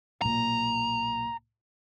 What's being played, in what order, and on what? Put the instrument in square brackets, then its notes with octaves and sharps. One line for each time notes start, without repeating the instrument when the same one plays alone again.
[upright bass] B1 A#2 [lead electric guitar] A#5